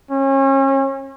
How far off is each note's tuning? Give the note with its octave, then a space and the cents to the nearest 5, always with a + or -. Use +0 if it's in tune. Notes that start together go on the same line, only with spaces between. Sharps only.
C#4 -35